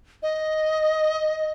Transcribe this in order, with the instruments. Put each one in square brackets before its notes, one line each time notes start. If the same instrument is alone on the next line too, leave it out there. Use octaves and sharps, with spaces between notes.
[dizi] D#5